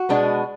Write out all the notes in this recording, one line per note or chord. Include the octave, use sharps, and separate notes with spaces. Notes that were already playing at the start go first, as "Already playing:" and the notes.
Already playing: F#4
B2 G#3 B3 D4